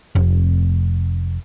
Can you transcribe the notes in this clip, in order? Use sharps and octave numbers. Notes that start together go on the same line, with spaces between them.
F1